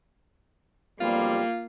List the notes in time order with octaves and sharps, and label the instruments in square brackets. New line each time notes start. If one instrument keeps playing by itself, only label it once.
[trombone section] B1 F2 G3 [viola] A#3 [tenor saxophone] F4